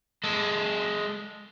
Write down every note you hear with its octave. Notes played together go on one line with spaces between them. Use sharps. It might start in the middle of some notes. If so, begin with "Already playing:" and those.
G#3 A4